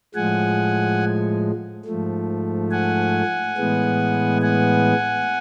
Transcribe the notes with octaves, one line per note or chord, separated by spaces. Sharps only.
A2 F3 G#3 F#5 G#5
G#2 F3 A3
F#5 G#5
A2 E3 G#3 B3
F#5 G#5